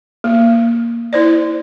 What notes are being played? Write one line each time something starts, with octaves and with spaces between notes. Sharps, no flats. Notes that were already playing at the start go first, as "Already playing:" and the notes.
A#3
E4 C5 D5